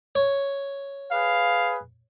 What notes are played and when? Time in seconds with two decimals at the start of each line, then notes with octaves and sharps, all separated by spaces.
0.15 C#5
1.12 G#4 B4 F5